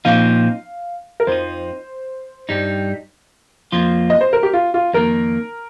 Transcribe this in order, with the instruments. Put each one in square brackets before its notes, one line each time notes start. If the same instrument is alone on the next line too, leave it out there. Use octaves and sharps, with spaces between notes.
[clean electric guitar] A#2 F3 C4 D#4 [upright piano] F5
[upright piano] A#4
[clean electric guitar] F2 F3 D#4 [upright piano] C5
[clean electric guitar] G2 G3 D#4
F2 F3 A#3 F4
[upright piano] D#5
C5
A#4
G4
F4
F4
[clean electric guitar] F2 D#3 A#3 [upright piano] A#4